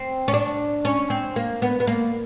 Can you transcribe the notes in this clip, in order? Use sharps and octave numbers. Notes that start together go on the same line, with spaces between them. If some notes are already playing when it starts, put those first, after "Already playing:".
Already playing: C4
C#4
D4
C#4
C4
A#3
B3
B3
A#3